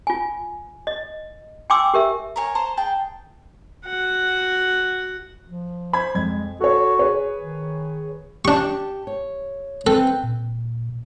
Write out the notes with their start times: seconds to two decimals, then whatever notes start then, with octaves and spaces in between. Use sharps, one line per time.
0.07 F4 G#5
0.87 D#5
1.70 G5 G#5 C6 D6 E6
1.94 G4 A#4 E5
2.36 A#4 C#5 G#5
2.55 C5 A5 A#5 C6
2.77 G#4 G5 A5
3.86 F#4 F#5
5.47 F3
5.93 C5 B5 G#6
6.15 F2 G#3 G#6
6.60 F#4 A4 C#5
6.99 G#4 B4 C#5
7.38 D#3
8.45 D4 G4 A5 C#6
9.07 C#5
9.87 C4 A4 B4
10.23 A#2